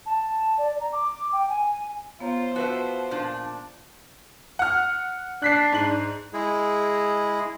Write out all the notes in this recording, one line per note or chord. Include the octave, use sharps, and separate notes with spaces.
A5
D5
A#5
D6
G5
G#5
B3 F4 C5 C#5 A#5
F3 F#4 B4 E5
A#2 D4
F#5 F6
D4 F#6 B6 C7
G#2 F#7
G#3 E4 G#4